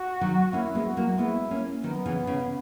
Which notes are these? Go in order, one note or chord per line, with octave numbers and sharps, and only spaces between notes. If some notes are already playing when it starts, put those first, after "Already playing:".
Already playing: F#4
D#3 F#3
A#3 C#4 E4
G#3 B3
F#4
F#3 A#3
G#3 B3 E4
A#3 C#4
D#3 F#3 B3
C#3 E3
C#3